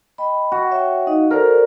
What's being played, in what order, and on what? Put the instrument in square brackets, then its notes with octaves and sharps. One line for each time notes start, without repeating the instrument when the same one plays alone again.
[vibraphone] D#5 G5 B5
[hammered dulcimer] F#4
[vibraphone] C#5 E5 G5
D#4 D#5 F5
[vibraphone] A4 C5 D5 [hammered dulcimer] A#4